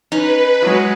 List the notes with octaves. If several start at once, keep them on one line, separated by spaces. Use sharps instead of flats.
C#4 D#4 B4
F#3 G#3